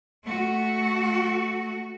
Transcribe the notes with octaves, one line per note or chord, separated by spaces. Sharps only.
A3 F#4